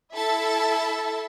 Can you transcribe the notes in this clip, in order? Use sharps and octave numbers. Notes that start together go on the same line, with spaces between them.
E4 A4 E5 A5